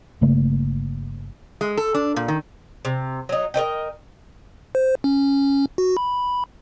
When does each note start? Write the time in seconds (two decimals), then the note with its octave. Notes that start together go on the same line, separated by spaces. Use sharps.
0.21 G1 C#3 A3 A#3
1.61 G#3
1.77 A4
1.94 D4
2.16 A#2
2.28 D#3
2.85 C3
3.29 F#3 D#4
3.54 A#4 B4 D#5 G5
4.75 C5
5.04 C#4
5.78 F#4
5.97 B5